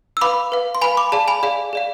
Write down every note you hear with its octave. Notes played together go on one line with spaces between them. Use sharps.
E6
B4 F5 B5 D6
B4 F5
C6
B4 F5 G#5 B5
B5 D6
G#4 D5 F5 A5
G#5 B5
G#4 D5 F5
G#4 D5 F5